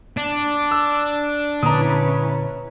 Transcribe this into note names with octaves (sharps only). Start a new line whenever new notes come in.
D4
E6
A#2 D3 A#3 C#4 E4 B4 A#5 D#6